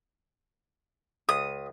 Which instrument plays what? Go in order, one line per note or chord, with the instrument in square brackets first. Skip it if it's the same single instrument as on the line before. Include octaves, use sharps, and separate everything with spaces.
[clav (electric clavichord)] C#2 [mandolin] D#6